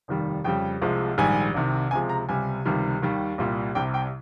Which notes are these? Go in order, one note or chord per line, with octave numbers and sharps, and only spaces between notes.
F1 D#2 D#3 G3
F2 C#3 G3 G5
C2 C3 F3 G#3
A#1 G#2 D#3 G3 G#5
C2 C3 D#3
C#2 C3 F3 G#3 G#5
A#5
C#2 C3 G3 G#5
C#2 C3 D#3 G3
D#2 D#3 G3
C2 A#2 G3
C2 C3 G3 G5
G5